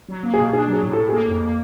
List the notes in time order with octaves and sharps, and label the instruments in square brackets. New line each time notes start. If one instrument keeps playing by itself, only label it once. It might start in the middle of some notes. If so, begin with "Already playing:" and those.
[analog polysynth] F#3
A#3
[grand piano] G#4
[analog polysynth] B2
[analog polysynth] D4 [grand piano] G#4
[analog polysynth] F#3
[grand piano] G#4
[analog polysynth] A2
[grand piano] A4
[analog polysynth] A2
[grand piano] G#4
[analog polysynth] A#3 [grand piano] A4
[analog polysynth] F2
A#3